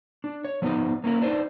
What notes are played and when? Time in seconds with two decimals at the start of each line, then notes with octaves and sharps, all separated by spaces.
0.24 D4
0.45 C#5
0.62 F3 B3 D#4 B4 C5
1.04 A#3 C#4 E4 A#4
1.22 D4 D#4 B4 C5